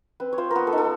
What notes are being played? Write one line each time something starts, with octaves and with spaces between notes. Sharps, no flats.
C4 B4
C#5
F4 C5
B3 A#4 B4
A4
D#4
A4